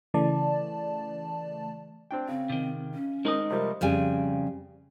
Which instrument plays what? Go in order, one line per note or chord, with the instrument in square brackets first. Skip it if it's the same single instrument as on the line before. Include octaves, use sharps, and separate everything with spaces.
[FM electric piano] C#3 E3 A3 D5 A5
[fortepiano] C4 D4 G5
[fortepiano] C#3 [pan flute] C4
[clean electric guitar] C3 D#3
[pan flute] C#4
[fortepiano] D#3 D#4 A#4 [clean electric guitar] G#3 C4 D#5
[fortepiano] C3 F3 G3 [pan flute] A#4
[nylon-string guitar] F2 C#3 G3 G#5